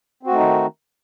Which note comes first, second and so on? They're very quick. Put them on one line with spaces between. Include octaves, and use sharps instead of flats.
C4 F#4 A3 D#4 D#3